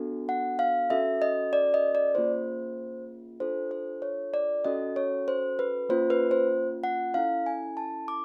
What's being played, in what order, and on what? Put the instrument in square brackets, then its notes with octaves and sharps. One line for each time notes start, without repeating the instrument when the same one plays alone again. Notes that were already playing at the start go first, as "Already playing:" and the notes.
Already playing: [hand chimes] B3 D4 F#4 A4
F#5
F5
C#4 F#4 A4 E5
D#5
D5
D#5
D5
A#3 C#4 F4 G#4 C5
D4 F4 A4 C5
C5
C#5
D5
C#4 F#4 A4 D#5
C#5
C5
B4
A#3 C#4 F4 C5
B4
C5
F#5
C#4 E4 A4 F5
G#5
A5
D6